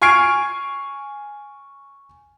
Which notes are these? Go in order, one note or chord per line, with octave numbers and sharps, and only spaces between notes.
G#5 C#6 F6 G#6 C7 D7